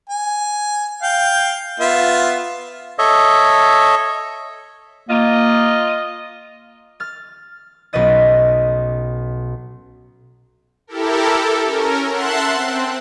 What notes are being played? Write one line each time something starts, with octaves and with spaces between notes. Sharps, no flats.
G#5
F5 G5
B3 F4 E5
A4 C#5 D#5 E5
A#3 F4 D#5
F6 A6
B1 C#4 B4 D#5 A6
E4 G4 A4 A#4
A4
C#4 A#4
E5 F#5 A5 C6 F#6
C4